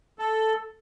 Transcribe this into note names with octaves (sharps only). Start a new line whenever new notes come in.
A4